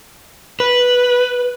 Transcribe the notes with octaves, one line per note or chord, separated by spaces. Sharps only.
B4